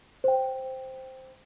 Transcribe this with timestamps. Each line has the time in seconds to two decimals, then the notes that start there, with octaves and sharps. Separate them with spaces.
0.24 C5 G5